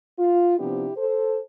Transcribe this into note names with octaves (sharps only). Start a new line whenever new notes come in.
F4
C3 F3 B3 D4 E4 G4
A4 C5